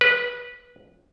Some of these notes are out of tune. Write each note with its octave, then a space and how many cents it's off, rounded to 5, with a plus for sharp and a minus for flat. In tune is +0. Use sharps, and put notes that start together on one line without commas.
B4 -20